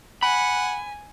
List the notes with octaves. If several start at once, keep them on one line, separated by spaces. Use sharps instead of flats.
F#5 G#5 B5